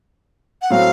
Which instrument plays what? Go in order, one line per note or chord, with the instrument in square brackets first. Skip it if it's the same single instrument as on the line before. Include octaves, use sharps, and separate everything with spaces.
[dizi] F#5
[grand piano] A2 F#3 A3 C4 F#4 [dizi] F5